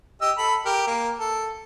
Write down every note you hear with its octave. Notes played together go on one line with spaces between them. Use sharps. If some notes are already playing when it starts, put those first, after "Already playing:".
G4 D#5 E6
A4 B5
G4 A#4
A#3
A4